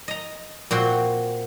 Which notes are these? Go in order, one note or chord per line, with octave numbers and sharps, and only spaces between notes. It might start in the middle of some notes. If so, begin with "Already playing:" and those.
D#5 A#5
A#2 C4 F#4 C6